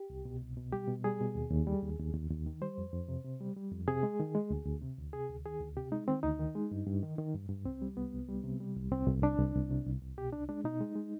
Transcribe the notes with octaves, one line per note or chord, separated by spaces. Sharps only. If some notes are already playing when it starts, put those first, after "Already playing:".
Already playing: G4
C2
B2
C2
B2
G3 G4
B2
G3 G#4
B2
D#2
D#2
G3
D#2
D#2
D#2
D#2
D#3
G3 C5
F2
F2
C3
C3
G3
G3
F2
C3 G#4
G#3
D#3
G#3
D2
D2
C3
D2
C3 G#4
D2
D#3 G#4
D2
C3 G4
G#3 D#4
D#3 C4
D2 D#4
D#3
G#3
G2
G2
D#3
D#3
G2
G2
C2 C4
G3
C2 B3
C2
G3
C3
G3
C2
C2 C4
C2
C2 D4
C2
C2
C3
C2
C2
B2 G4
C2 D4
G#3 D4
B2 D#4
G#3
G#3